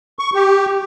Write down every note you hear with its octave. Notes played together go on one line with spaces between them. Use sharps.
C#6
G4